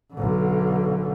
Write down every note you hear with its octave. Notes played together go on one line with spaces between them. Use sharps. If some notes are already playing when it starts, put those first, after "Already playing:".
B1 D3